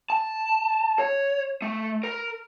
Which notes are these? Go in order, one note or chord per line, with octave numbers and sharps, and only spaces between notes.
A5
C#5
A3
A#4